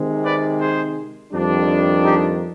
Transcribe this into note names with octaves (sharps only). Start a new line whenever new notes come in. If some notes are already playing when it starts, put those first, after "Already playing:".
Already playing: C3 D#3 G#3 C4
B4 D5
G#4 C5
F2 D#3 G3 D4
D#4 G4